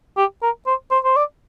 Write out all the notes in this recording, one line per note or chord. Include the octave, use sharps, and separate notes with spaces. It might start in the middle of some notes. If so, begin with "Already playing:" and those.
G4
A#4
C5
C5
C5
D5